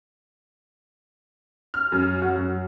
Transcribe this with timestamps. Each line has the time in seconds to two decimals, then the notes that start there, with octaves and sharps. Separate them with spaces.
1.74 F6
1.92 F#2
2.22 F#4
2.36 F#2